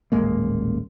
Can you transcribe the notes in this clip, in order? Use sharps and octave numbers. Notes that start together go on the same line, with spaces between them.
D#1 A1 G#3 A#3